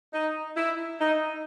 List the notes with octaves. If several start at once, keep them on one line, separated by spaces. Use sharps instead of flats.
D#4
E4
D#4